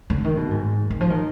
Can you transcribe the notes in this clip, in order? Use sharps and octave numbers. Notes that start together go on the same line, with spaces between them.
D3
D#3
B2
G#2
D#3
F3
D#3